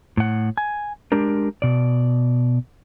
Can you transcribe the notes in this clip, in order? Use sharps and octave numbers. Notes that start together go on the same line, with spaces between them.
A2 F#5
G#5
G#3 D4 G4 A#4
B2 D5